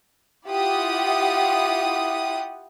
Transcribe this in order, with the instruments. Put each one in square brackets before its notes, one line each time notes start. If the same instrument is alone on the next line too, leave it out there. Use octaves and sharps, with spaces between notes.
[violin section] E4 F4 G4 F#5 D#6